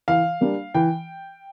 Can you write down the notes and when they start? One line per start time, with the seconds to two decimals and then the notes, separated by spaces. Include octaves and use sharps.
0.08 E3 F5
0.41 G3 A#3 D4
0.74 E3 G5